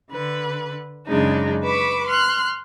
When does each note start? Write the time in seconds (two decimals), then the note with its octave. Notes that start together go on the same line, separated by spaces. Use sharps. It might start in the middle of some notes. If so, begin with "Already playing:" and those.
0.10 D3 B4
1.07 F#2 C#3 G#3 D4 D#4
1.62 B4 B5 C#6 D6 E6
2.07 C6 F6 F#6